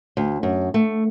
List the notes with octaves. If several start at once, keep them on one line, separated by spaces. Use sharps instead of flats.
D2
F#2
A3